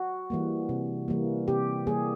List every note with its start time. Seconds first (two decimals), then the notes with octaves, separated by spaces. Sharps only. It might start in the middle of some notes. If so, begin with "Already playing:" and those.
Already playing: F#4
0.30 E3 G3 A#3
0.69 C3
1.08 E3 G3 A#3
1.48 C3 G4
1.87 E3 G3 A#3 G#4